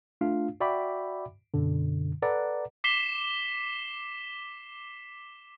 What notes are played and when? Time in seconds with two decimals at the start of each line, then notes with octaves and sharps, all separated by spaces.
0.21 A3 D4 F4 F5
0.60 F#4 D5 E5 G5 B5 D6
1.54 F#2 B2 D3
2.22 A4 B4 D5 F#5 A#5
2.84 D6 B6 C7 E7 G7